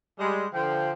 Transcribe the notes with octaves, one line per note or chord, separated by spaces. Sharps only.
G3 G#3
D3 F3 G5